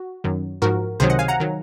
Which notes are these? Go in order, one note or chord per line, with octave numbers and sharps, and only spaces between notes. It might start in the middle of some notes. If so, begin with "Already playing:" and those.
Already playing: F#4
F#2 D#3 F#3
G#2 F3 F#4 A#4
C#2 C3 D#3 F#3 G#4 C5
D#5 F#5
F5 G#5
F#5 A#5
D#3 F#3